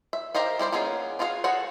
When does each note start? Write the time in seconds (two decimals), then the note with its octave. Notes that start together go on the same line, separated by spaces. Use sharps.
0.13 E5
0.35 G4 A#4 C5 D#5 F5
0.59 G3 E4 C5 D5
0.72 A#3 B3 C#4 D#4 G#4
1.19 D4 F4 F#4 G#4 F5
1.44 F#4 G#4 A4 F#5